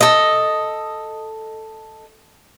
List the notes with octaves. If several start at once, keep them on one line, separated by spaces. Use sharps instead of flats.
A4 D#5